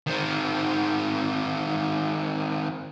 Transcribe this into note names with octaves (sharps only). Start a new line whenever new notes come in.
D#3 C4